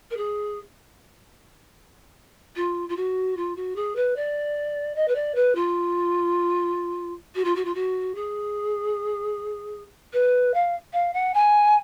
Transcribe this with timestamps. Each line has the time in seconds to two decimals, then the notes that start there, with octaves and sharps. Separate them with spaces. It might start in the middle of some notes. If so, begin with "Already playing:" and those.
0.10 A#4
0.16 G#4
2.55 F4
2.88 F4
2.96 F#4
3.36 F4
3.55 F#4
3.75 G#4
3.95 B4
4.15 D5
4.95 D#5
5.07 B4
5.15 D5
5.34 B4
5.55 F4
7.35 F#4
7.44 F4
7.55 F#4
7.64 F4
7.74 F#4
8.14 G#4
10.12 B4
10.53 F5
10.92 F5
11.13 F#5
11.33 G#5